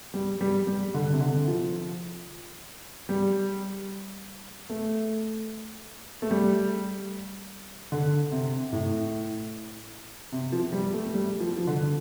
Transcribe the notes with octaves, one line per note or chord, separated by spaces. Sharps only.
G3
G3
G3
D3
C3
D3
F3
G3
A3
A3
G3
D3
C3
A2
C3
F3
G3
A3
G3
F3
F3
D3